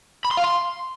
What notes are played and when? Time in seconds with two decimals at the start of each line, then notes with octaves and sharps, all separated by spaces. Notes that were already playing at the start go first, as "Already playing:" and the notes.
0.25 B5
0.31 C6
0.37 F5
0.44 C6